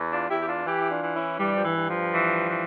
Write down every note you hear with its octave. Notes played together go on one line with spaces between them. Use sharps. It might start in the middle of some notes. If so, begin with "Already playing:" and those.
Already playing: E2
D4 F4
E2 E4 G4
G4
D4 F4
E3 E4 G4
E4
D4 F4
E3
C#4 E4
G2 E3 G3
F3
E3
G2
F3
E3
E3